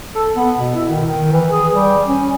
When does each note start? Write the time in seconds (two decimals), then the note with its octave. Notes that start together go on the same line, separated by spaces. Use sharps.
0.15 A4
0.35 B3
0.59 B2
0.75 E4
0.89 D#3
1.07 D#3
1.32 E3
1.50 G#4
1.73 G3
2.08 C#4